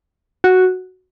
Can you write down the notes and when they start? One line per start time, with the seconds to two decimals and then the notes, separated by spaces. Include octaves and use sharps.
0.44 F#4